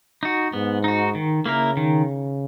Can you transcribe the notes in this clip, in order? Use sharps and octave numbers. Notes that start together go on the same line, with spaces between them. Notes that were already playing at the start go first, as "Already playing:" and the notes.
D#4 F#4
G#2 B3
D#4 F#4
D#3
C#3 A#3 E4 A#4
D#3